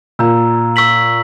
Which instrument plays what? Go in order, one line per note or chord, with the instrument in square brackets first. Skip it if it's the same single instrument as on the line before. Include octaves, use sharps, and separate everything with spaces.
[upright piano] A#2 [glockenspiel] A#5 E6 G6
[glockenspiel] C#6 E6 B6 F#7